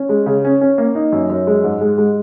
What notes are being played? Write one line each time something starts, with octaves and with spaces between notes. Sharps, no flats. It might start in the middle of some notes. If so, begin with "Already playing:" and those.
Already playing: C#4
G#3
C#3
C#4
C#4
A#3
D#4
F#2
F#2
G#3
G#2
G#3
G#3